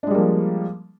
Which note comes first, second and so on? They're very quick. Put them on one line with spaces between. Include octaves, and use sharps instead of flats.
D4 G#3 G3 A#3 F3